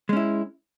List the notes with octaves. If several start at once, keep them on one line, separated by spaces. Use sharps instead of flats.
G#3 C#4 E4